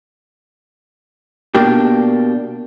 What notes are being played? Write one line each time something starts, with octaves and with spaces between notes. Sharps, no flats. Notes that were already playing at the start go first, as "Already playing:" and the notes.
B2 A#3 D4 G4